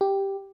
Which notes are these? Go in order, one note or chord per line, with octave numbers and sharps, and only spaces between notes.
G4